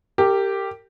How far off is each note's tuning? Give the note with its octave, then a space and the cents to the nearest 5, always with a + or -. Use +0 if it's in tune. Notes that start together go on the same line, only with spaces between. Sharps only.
G4 +0 A#4 -30